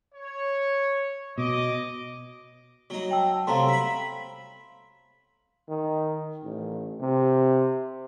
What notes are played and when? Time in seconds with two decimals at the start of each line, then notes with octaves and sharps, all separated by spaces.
0.15 C#5
1.38 B2 D#5 D6
2.90 F#3 D#4
3.11 G5 A5 E6
3.47 C3 F#3 A3 F5 A#5 C6
3.68 E5 B5
5.69 D#3
6.44 A1
7.01 C3